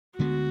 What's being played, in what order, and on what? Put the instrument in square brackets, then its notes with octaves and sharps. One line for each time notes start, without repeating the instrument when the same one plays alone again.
[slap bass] D2 D3 G#3 B3 [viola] F#4